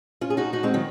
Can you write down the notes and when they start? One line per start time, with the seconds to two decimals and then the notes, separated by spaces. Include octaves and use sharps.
0.21 C#4 F4
0.30 G#4
0.37 D#4 F#4
0.53 D#4 F#4
0.63 G#3 C4
0.74 D#3 F#3